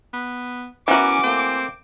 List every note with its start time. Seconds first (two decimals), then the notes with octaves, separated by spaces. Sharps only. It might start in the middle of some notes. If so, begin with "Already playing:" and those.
0.13 B3
0.88 E3 B3 C#4 E4 F#4 A#4 D6
1.23 A3 A#3 C4